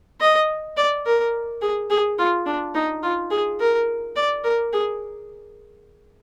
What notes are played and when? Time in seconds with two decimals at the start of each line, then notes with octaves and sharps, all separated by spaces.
0.21 D#5
0.77 D5
1.06 A#4
1.62 G#4
1.90 G#4
2.18 F4
2.46 D4
2.75 D#4
3.03 F4
3.31 G#4
3.60 A#4
4.16 D5
4.44 A#4
4.73 G#4